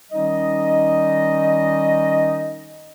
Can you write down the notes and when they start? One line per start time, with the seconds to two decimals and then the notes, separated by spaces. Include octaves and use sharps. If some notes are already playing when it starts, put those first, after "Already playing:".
0.12 D#3 G3 C#4 D#4 D#5